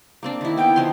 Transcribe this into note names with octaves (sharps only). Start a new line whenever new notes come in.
A#3 C4 D4
D#3 E4
B3 G5
D#3 F3 C6